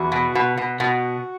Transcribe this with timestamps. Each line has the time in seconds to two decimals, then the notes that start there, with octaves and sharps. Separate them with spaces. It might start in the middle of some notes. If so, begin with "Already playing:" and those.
Already playing: E2 F#4
0.12 B2
0.35 B2
0.58 B2
0.80 B2 F#4